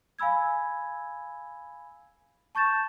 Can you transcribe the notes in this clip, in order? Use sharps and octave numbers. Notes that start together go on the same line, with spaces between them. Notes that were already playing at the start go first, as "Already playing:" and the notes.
F5 G#5 B5 E6 G#6
A5 C#6 G6 A6 E7